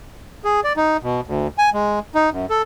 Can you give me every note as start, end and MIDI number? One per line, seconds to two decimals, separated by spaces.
0.44 0.60 68
0.64 0.73 74
0.76 0.97 63
1.03 1.21 47
1.27 1.47 38
1.58 1.70 80
1.73 1.99 56
2.15 2.30 63
2.31 2.46 42
2.50 2.62 69